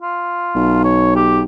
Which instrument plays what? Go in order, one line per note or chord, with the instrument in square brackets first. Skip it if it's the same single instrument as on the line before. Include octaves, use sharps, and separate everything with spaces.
[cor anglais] F4
[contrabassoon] B1
[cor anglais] C#5
G4